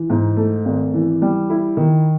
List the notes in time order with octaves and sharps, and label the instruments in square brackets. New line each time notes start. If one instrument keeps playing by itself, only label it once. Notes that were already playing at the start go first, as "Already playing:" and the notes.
Already playing: [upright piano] E3
G#2
A3
G#1
E3
G3
E4
D#3